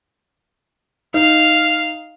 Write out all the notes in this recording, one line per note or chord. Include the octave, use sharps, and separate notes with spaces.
D#4 F5